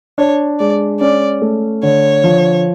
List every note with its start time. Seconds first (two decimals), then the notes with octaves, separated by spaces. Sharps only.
0.18 D4 C#5
0.59 G#3 D5
1.00 C#4 D5
1.42 A3
1.83 D3 C#5
2.24 F3